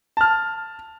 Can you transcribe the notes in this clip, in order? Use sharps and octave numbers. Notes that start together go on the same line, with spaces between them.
A5 F6